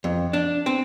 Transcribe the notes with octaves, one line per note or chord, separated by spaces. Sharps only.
F2
D4
C4